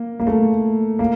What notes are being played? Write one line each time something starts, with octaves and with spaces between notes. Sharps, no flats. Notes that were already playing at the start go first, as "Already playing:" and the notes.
Already playing: A#3
A#3
A3
A#3